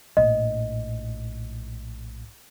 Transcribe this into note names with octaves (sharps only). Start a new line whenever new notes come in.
A#1 A2 D#5